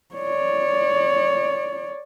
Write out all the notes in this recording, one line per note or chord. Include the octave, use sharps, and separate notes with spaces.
C#5 D5